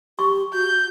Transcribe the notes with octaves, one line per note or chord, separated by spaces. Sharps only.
G4 C#6
F#4 G6